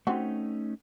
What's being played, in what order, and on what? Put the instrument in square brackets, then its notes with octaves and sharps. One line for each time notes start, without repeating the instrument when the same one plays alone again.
[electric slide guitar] A3 C#4 D#4 [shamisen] C4 F#4